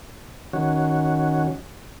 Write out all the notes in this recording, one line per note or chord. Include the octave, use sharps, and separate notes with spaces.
D#3 C#4 F#4